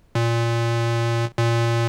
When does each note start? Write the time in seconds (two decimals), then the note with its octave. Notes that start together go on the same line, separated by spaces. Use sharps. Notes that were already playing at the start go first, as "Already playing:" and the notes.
0.15 A#2
1.37 A#2